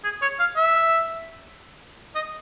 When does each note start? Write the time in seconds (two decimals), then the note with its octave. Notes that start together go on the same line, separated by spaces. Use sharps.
0.04 G#4
0.22 C#5
0.39 F5
0.57 E5
2.15 D#5